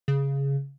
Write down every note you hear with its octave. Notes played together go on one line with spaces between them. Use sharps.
C#3